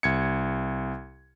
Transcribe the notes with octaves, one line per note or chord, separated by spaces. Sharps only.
C2 G#6 C#7